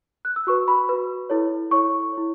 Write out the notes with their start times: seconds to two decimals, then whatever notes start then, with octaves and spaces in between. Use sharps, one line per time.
0.25 F#6
0.36 E6
0.47 F#4 B4 C#6
0.68 B5
0.89 F#4 B4
1.30 E4 A4 C#5
1.71 E4 A4 C#5 C#6
2.12 C#5
2.17 E4